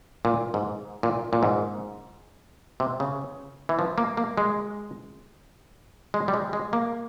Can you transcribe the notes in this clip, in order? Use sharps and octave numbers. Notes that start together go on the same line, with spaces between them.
A#2
G#2
A#2
A#2
G#2
C3
C#3
E3
F3
A#3
A#3
G#3
G#3
G3
G#3
G#3
A#3